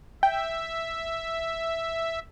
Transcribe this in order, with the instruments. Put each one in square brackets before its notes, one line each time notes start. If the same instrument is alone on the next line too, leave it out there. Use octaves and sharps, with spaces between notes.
[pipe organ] E5 [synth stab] G5